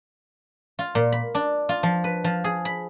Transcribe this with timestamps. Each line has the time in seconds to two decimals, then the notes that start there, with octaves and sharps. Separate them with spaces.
0.79 F4
0.95 A#2
1.12 B5
1.35 D4
1.69 F4
1.83 F3
2.04 B4
2.24 F3
2.44 G#4
2.65 B5